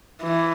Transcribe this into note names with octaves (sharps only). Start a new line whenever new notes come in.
E3